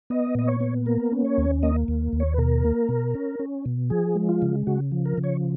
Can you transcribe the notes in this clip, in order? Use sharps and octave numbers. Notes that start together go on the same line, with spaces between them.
B3 D#5
A#2 D#5
C#5
B3
A#3 A#4
C#4
C#5
D#2
A#3 D#5
D#2
D#2
C#5
B4
B2 A#4
A#3
B2
C#4
C#4
B2
F3 G#4
G#3
F4
C#3
C#3 F#4
F3
A#4
C#3
C#5